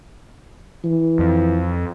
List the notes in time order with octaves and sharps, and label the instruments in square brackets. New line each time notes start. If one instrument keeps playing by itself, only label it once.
[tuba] E3
[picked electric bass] F2